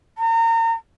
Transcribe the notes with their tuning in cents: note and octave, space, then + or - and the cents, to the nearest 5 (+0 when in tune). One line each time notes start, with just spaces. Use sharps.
A#5 -35